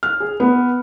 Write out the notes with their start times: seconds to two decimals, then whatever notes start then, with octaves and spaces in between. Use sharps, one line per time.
0.03 F6
0.20 G#4
0.40 B3